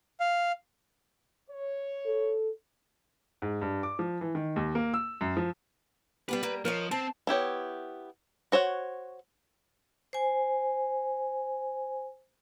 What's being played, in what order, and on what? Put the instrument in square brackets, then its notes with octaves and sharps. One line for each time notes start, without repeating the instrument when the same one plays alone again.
[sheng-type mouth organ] F5
[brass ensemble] C#5
[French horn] A4
[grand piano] G#2
G2
D6
F3
E3
D#3
D#2
A#3
E6
F#2
F3
[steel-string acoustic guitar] G3 B3 G4 [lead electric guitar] B4
[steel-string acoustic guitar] G3 A#3
[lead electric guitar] F3 [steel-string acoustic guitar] A#4 C#5 D#5
[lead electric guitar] C4 [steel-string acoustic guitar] A5
[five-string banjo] B3 E4 G4 C#5
F#4 C5 C#5 F#5
[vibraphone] C5 G#5